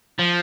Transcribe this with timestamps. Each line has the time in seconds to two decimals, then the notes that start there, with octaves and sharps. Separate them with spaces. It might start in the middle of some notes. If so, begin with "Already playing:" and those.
0.19 F3